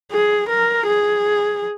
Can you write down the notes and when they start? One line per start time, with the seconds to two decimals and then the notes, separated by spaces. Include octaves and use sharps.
0.12 G#4
0.49 A#4
0.86 G#4